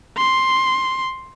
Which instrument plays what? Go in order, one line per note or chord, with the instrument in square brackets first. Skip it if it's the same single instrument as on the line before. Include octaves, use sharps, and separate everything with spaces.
[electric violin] C6